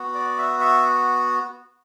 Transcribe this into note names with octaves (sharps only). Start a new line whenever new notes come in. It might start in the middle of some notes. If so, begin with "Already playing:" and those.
Already playing: B3 F#4
D5
E5
E5